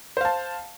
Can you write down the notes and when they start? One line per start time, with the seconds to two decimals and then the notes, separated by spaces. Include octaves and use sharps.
0.17 C5
0.21 F5
0.25 A5